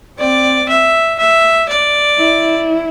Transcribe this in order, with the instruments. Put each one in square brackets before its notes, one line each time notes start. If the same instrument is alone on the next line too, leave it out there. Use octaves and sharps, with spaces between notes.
[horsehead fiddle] C4 [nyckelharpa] D5
[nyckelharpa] E5
E5
D5
[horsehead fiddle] E4